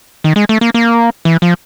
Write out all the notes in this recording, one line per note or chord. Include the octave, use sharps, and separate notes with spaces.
D#3
G#3
A3
A#3
A#3
E3
F3